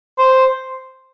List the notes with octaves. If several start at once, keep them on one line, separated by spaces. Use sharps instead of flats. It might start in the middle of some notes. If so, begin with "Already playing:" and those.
C5